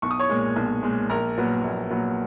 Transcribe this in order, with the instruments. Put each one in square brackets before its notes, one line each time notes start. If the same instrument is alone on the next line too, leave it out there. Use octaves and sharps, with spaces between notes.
[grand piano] B1 C#6
D#6
C#5 C#6
A#2 G#3
B1
A#2 G#3
A#1 A#4 A#5
A#2 F#3 B3
A#1
A#2 F#3 B3